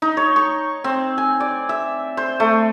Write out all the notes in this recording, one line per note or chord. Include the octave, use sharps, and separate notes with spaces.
D#4
C#5
C#6
C4
G#5
D5
E5
C5
A3